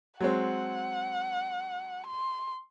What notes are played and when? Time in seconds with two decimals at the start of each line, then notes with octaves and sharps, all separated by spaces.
0.21 F#3 G#3 C4 F#5
2.07 C6